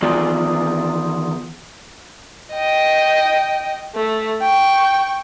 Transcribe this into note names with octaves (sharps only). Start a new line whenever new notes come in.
D#3 E3 B3 F4 G#4 D5
D#5 G5
A3
G5 C#6